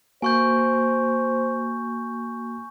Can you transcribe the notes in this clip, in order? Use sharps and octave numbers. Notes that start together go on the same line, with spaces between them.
A#3 F#4 C5 G#5 C#6 G6